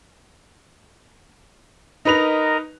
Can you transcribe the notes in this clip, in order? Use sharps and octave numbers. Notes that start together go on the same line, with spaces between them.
D#4 A#4 B4 D#5 A#5 F7